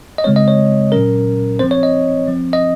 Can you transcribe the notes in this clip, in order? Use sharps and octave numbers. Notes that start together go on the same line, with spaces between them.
D#5
C#3 G#3 C4 C#5
D#5
C#5
A#2 F#3 C#4 A#4
F3 C4 C5
C#5
D#5
F3 C4
D#5